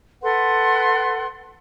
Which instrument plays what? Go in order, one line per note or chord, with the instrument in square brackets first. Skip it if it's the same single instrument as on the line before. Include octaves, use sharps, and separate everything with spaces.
[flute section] A4 B4 F#5 C6